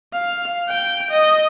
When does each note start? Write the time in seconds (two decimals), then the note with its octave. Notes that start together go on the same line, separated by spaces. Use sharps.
0.14 F5
0.69 G5
1.11 D#5